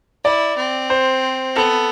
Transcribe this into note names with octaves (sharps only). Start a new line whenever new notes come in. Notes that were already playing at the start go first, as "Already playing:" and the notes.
E4 D5
C4
C5
B3 A4